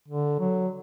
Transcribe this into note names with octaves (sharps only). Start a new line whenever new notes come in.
D3
F#3